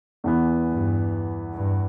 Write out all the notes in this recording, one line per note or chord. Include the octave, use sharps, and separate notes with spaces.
E2 E3 B3
G2
G2